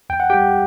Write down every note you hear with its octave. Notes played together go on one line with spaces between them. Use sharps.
E2 G5
F#5
G3 G4 G5